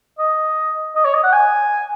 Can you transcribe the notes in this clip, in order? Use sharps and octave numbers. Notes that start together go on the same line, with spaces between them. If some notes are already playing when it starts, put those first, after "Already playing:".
D#5
D#5
C#5
D#5
F#5
G#5